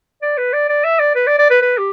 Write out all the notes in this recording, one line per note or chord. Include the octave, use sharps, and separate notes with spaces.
D5
B4
D5
D5
E5
D5
B4
D5
D5
B4
B4
G4